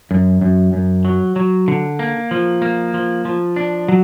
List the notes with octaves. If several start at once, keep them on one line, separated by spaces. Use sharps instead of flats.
F#2
F#2
F#2
F#3
F#3
D3
A#3
F3
A#3
F3
F3
D4
F#3